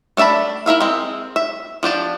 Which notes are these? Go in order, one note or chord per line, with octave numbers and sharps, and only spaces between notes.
A3 D4 E5 A5 B5
E4 A#4 E5 F5
G#3 C4
E5
F3 D4 G4 A5